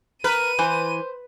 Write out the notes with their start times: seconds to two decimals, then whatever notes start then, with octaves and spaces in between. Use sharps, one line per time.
0.24 A#4 B4 D#7
0.59 E3 C5